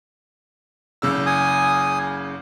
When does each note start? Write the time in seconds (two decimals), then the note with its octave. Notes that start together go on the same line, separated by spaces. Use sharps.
1.02 F#1 C#3 E6
1.26 G#5 D#6